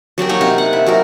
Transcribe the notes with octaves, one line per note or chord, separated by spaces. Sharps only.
F#3 D4 G4 A#4
A#3 D#4 C#5 D#5
C3 D4 D#4
F#5
E4
F#3 D#4 A#4